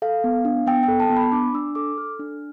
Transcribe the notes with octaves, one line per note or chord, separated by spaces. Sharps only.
A4 F5
B3
D4
B3 G5
A4 G5
A5
B3
B5
D4 D6
D4 E6
A4 D6
A4 F6
D4